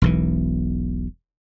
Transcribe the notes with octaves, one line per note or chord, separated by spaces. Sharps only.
E1 B1 E3